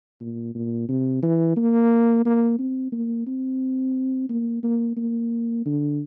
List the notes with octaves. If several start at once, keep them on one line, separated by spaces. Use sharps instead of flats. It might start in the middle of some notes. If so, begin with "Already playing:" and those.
A#2
A#2
C3
E3
A#3
A#3
C4
A#3
C4
A#3
A#3
A#3
D3